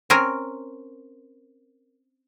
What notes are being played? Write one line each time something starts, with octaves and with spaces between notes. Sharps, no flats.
C4 C#4 A#4